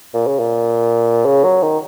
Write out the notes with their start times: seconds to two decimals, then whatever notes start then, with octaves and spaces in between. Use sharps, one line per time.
0.14 A#2
0.27 C#3
0.40 A#2
1.25 C#3
1.44 F#3
1.62 D#3